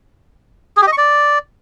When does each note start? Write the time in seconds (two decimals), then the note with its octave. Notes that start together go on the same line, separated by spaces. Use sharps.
0.77 G#4
0.82 G4
0.87 D#5
0.92 C#6
0.98 D5